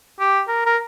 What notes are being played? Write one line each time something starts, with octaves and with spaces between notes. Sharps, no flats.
G4
A#4
A#4